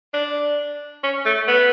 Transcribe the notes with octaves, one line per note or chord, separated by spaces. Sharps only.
D4
C#4
A3
B3